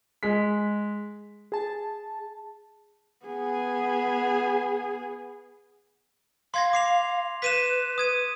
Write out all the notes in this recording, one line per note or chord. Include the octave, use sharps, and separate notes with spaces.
G#3 B6
G#4 A5
B3 G#4
F5 C6 G#6 A#6
D6 C7 F7
B4 B6 D#7 E7
D#6 G#6 D#7